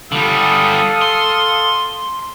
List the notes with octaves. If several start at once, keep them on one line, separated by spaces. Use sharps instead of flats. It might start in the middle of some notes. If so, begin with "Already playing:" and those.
D3 G3 A4 F5 D#6
C6